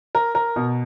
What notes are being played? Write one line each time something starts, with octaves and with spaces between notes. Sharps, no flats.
A#4
A#4
B2